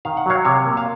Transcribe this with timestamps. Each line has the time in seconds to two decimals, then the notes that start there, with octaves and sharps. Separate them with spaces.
0.05 D#3 F5
0.17 F#5
0.26 F#3 C#5 F5
0.45 C3 C#5 F5
0.66 A#3
0.77 F5